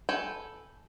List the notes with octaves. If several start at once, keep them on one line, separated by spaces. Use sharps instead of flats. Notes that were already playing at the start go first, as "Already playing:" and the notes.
A4 B4 G5 G#5